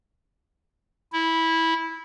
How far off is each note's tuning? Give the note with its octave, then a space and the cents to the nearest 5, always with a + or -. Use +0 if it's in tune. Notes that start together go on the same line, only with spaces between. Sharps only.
E4 -15